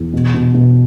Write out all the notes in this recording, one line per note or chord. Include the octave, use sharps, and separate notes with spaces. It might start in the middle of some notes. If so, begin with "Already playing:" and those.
Already playing: E2
B2
B2
B2